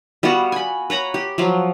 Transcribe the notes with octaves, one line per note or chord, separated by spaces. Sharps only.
G3 B3 F4 F#4
G#5 B5
B4 C#5 A#5 B5
G4
F3 F#3 F4